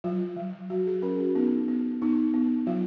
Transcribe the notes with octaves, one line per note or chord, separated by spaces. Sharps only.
F#3 F4
F#3
F#3 F#4
G#4
C#4 A#4
F#4
B3 D#4
B3
B3 D#4
B3
F#3 F4